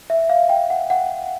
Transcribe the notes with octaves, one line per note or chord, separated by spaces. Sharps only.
E5
F5
G5
F#5
F#5